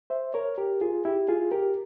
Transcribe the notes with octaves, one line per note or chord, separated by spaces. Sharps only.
C5 E5
A#4 C#5
G4 A#4
F4 G#4
E4 G4
F4 G#4
G4 A#4